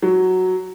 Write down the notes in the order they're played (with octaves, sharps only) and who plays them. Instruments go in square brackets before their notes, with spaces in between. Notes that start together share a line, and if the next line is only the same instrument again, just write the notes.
[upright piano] F#3